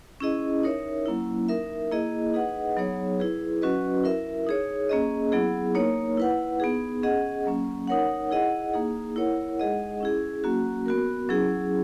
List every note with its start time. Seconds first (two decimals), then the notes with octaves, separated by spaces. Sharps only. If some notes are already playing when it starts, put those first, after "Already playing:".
0.20 C#4 E4 G#4 D#5
0.63 D#4 A#4 C#5 E5
1.06 F#3 A#3 C#4 E4
1.48 D#4 A#4 E5
1.91 A#3 E4 G#4 D#5
2.34 D#4 G#4 B4 D#5 F#5
2.77 F#3 B3 D#4 G#4 C#5
3.19 E4 G#4 B4
3.62 F#3 C#4 F#4 B4 D#5
4.04 E4 A#4 E5
4.47 D#4 G#4 C#5
4.89 A#3 C#4 G#4 D#5
5.32 F#3 B3 E4 G#4
5.75 A#3 D#4 A#4 C#5
6.17 E4 B4 F#5
6.60 B3 D#4 G#4
7.03 C#4 G#4 D#5 F#5
7.45 F#3 A#3 C#4
7.87 D#4 A#4 C#5 F#5
8.31 E4 G#4 D#5 F#5
8.73 A#3 D#4 G#4
9.16 E4 A#4 C#5 F#5
9.58 G#3 D#4 G#4 D#5 F#5
10.00 C#4 E4 G#4
10.44 F#3 A#3 C#4 F#4
10.86 B3 F#4 A#4
11.29 F#3 C#4 E4 G#4